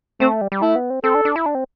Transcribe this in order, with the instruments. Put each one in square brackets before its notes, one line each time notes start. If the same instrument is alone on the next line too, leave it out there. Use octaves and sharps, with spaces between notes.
[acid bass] A3 [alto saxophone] C4
[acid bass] G3
G3
[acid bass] A3 [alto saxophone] E4
[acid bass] B3
C4
[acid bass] C4 [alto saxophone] A4
[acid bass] D4
D4
E4
D4
C4